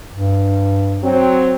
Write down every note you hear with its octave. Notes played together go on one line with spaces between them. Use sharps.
G2
F#3 C4